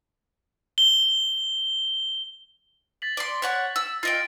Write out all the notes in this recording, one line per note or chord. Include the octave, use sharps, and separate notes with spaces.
G7
A6 B6 F#7
D5 C6
C#5 F#5 C#6 B6
E6
F4 D#5 G5 A6 D7